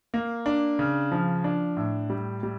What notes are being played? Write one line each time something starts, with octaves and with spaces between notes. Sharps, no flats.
A#3
D4
C#3
F3
D4
A2
G3
G3